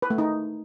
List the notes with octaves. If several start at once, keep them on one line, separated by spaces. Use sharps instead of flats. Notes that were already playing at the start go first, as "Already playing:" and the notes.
B4
A3
D#4